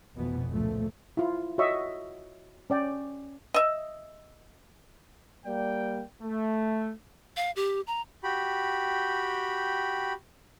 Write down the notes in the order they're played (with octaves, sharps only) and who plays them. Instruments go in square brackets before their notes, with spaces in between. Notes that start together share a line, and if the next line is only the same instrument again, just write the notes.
[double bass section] F1 F2 B2 E3 B3
C#2 A#2 F3 A3
[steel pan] E4 F4
F#4 C#5 D#5 E5 C#6
C#4 D5 G5
[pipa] D#5 E5
[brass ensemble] G3 A#3 D5 G5
A3
[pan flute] F5
G4
A#5
[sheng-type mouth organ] F#4 G4 G5 B5